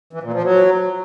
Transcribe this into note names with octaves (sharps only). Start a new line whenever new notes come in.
E3
A#2
F3
F#3